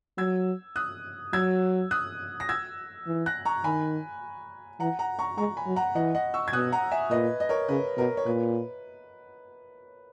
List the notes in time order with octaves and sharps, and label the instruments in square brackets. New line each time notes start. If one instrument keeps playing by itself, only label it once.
[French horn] F#3 [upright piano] E6 G#6
[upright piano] D#6 F#6
[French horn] F#3 [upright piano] E6 G#6
[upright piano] D#6 F#6
A#6
E6 G#6
[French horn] E3
[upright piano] F#6 A#6
A#5 C#6
[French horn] D#3 [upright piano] G#5 B5
[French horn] E3 [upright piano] F#5 A#5
[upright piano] F#5 A#5
A#5 C#6
[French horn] G#3 [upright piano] A#5 C#6
[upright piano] G#5 B5
[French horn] F#3
[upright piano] F#5 A#5
[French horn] E3 [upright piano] D#5 F#5
[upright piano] D#5 F#5
C#6 E6
G#6
[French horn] B2 [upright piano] D#6 F#6
[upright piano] F#5 A#5
E5 G#5
[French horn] A#2 [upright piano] B4 D#5
[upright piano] D#5
A#4 C#5
[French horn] C#3 [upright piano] B4
[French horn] B2 [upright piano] A#4
[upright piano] C#5
[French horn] A#2 [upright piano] B4